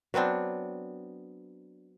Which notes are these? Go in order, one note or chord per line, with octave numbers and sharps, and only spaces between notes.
F#3 B3 C4 D4